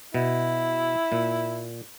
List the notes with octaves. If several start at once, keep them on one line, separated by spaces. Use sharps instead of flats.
B2 E4
A#2